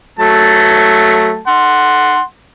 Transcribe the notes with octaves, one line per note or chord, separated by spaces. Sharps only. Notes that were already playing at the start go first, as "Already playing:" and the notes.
F#3 A3 A5
F#5 C6